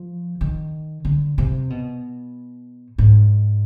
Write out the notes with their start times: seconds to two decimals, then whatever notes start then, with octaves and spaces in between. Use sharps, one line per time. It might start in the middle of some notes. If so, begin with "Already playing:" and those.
Already playing: F3
0.41 D#3
1.05 D3
1.38 C3
1.70 B2
2.98 G#2